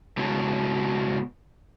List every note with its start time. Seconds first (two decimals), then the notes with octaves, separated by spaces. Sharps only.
0.17 C#2 B2